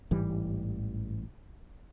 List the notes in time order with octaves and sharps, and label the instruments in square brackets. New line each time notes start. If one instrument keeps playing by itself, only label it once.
[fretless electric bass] A1 G#2 E3 G3